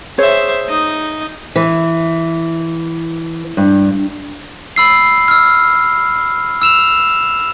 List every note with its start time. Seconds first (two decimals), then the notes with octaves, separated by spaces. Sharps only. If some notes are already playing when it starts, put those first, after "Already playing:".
0.18 G#4 C5 C#5 E5
0.67 D#4 D#5
1.56 E3
3.57 G2
4.76 B5 E6 C7
5.28 E6 F6
6.62 E6 E7 F7